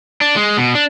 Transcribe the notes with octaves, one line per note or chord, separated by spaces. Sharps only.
D4
G#3
B2
D4